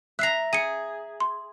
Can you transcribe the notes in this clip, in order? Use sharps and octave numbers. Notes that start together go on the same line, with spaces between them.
E5 A#5 F#6 C7
G#4 C#7 D#7
C6